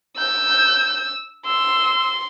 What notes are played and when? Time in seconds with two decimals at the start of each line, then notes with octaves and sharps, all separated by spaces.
0.18 E6 G6
1.47 C6 E6